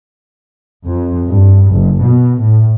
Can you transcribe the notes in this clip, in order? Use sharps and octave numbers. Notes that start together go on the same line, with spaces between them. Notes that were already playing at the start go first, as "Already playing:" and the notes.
F2
G2
F#1
B2
A2